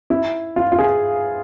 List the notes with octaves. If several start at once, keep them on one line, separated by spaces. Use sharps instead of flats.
E4
F4
F4
G#4